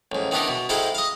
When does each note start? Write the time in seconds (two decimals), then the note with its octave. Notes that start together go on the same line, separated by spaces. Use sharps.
0.12 A1 G#2
0.31 D#3 E3 B3 D4 D#4
0.48 B2
0.69 G#2 G#3 E4 A4 F5 G5
0.95 D#5 F5